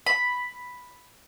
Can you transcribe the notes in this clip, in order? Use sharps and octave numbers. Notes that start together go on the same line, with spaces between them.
B5